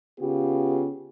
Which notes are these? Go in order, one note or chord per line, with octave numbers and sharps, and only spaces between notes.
C#3 B3 F4 G4